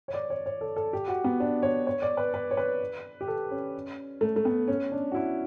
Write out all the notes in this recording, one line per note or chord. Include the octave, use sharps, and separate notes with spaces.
C#5
D5
C#5
C#5
A4
A4
G4
F#4
B3
D4
C#5
C#5
D5
B4
B4
C#5
B4
G4
A4
C#4
A3
A3
B3
C#4
D4
F#4
E4